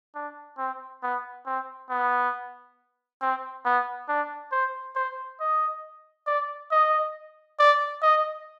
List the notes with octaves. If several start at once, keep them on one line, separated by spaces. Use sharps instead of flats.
D4
C4
B3
C4
B3
C4
B3
D4
C5
C5
D#5
D5
D#5
D5
D#5